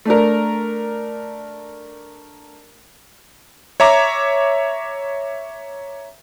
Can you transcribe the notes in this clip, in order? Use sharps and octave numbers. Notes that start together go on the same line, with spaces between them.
A3 D4 A#4
C#5 E5 A#5 D6